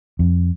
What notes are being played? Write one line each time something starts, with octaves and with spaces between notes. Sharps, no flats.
F2